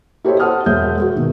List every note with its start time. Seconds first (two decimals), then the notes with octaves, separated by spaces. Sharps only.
0.24 E4 G4 A4 C5 C#5 D#5
0.40 C5 F#5 A5 D#6 F6
0.66 E1 G#3 C#5 E5 D#6 G6
1.00 F#4 G#4
1.16 B2 D#3